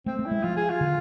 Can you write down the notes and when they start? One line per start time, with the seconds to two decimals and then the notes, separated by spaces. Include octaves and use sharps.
0.06 A3 C4
0.19 A3
0.26 E4
0.31 G#3
0.43 F3 F4
0.56 G#4
0.69 F4
0.81 D3